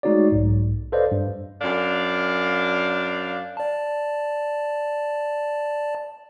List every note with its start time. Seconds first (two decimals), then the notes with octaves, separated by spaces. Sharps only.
0.03 G#3 A3 D#4 F#4 C#5 D5
0.32 B1 G#2
0.92 A4 B4 C5 D5 D#5 F5
1.12 G2
1.61 F#2 D4 F5
3.57 D5 A5